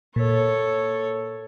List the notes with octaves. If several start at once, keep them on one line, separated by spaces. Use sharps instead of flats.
A#2 A4 C#5